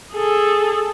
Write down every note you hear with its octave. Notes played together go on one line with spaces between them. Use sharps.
G#4 A4